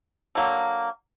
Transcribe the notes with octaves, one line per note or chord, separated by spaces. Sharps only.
D3 F#3 A#3